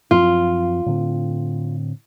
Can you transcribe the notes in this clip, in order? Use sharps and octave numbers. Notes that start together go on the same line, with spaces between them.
F#2 F3 C4 F4
A2 D3 C4